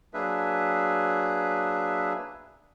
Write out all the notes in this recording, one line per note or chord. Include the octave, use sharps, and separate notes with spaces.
F#3 A#3 D4 G#4 B4 E5